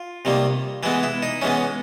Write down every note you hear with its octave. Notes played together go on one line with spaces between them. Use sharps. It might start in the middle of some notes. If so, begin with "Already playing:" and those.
Already playing: F4
C3 D#3 G3 A#3
E3 G#3 B3 E4
E4
D#4
E3 G#3 B3 C#4